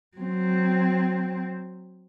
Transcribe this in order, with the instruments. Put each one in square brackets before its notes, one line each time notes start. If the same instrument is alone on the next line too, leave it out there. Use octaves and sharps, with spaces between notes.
[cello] F#3 C4